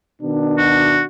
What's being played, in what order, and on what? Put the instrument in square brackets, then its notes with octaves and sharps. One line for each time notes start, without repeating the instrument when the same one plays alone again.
[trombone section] B2 D#3 D4
[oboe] F#4